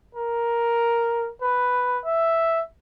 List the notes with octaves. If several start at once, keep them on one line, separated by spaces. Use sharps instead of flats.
A#4
B4
E5